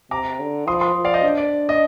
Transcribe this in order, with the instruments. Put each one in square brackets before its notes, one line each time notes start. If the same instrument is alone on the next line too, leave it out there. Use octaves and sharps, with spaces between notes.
[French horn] C3 [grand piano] A#5 D6
[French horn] D3
[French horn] F3 [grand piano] C6 D#6
[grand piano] C6 D#6
[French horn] F3
[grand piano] D5 F5
C5 D#5
[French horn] D4
[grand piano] D5
D#5